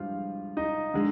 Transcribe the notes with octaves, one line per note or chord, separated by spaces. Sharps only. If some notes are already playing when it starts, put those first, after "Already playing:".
Already playing: G2 F3 G#3 F4 G4 F5
D#4 D#5
D3 G#3